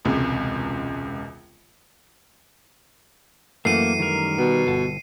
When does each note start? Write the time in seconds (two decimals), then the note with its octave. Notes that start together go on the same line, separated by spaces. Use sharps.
0.05 E1 C#2 C3
3.65 F#2 E3 A3 A#3 C7 C#7 D#7
4.00 D#3 G3 A#4
4.38 B2 B3
4.67 G1 A5